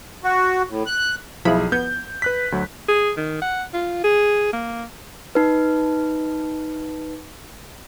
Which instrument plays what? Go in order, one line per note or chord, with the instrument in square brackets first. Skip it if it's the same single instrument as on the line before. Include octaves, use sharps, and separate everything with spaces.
[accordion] F#4
A2
F#6
[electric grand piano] B1 G#4 [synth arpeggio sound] F3 E4 B5
[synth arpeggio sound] B3 [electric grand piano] G6
[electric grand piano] B4 F#6 B6
D2 F#3
[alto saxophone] G#4
D#3
F#5
F4
G#4
A#3
[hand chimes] D#4 B4